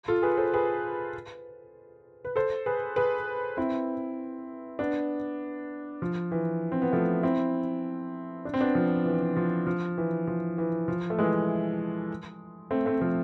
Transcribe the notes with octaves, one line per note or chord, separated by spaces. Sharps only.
F4 A4
G#4 B4
A4 C5
G#4 B4
B4
A4 C5
G#4 B4
G#4 B4
C4 E4
B3 D4
F3
E3
C4
B3
F3 A3
C4 E4
D4
C4
B3 D4
F3
E3
F3
F3
E3
F3
E3
F3
A3
E3 G#3
A3 C4
A3 C4
F3 A3